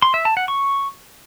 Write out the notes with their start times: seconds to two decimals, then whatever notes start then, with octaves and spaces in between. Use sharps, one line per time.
0.02 C6
0.14 E5
0.25 A5
0.37 F#5
0.48 C#6